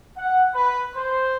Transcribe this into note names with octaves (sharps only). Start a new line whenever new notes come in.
F#5
B4
C5